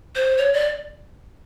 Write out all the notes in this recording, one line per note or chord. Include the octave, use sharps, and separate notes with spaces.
C5
C#5
D5